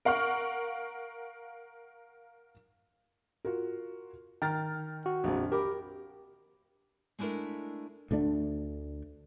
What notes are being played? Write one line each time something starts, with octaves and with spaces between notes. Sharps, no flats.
A#4 F5 F#5 C#6 F6
F4 F#4 A#4
D#3 G5 A#5 F6 A6
F#4
A#1 F2
G4 A#4 B5 D6
G#3 A3 D4 E4 A#4
D2 D3 A3 D4